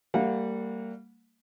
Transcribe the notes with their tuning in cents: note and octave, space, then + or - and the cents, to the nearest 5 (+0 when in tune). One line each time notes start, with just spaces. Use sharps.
G3 +0 A#3 -30 F#5 -30